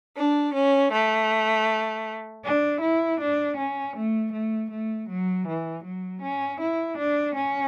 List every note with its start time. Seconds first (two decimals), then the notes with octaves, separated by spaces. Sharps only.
0.16 D4
0.54 C#4
0.92 A3
2.44 D4
2.81 E4
3.20 D4
3.57 C#4
3.95 A3
4.32 A3
4.70 A3
5.08 F#3
5.46 E3
5.84 F#3
6.22 C#4
6.59 E4
6.97 D4
7.35 C#4